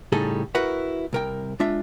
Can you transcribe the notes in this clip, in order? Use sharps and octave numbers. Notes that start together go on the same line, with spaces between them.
A2 C#3 G3 D#4 G#4 A4
E4 F#4 A#4 B4 F#5
C2 A#4 G5
G#3 D4 F4 E5